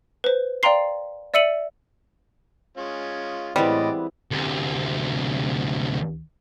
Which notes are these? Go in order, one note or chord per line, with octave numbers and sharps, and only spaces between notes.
B4 C5
D5 F5 G5 A#5 C6 C7
D5 E5 E6 C#7 D#7 F#7
G#3 C#4 F4
A2 E3 G3 G#3 B3 C4 D5 D#5
D2 C3